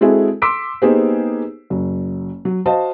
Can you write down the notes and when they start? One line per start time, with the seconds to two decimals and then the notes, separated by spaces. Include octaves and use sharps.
0.01 G#3 C4 E4 F#4 G#4 A4
0.42 C6 D6 E6 B6 D7
0.82 A#3 B3 D#4 G4 G#4 C5
1.70 F#1 F#3
2.45 F#3
2.66 F#4 C5 D#5 F5 A5